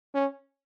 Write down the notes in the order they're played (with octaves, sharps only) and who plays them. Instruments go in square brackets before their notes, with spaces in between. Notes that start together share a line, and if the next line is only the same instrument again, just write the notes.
[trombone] C#4